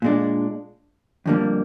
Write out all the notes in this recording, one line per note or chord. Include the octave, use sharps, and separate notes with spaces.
A#2 G#3 D4
F2 D3 G3 A#3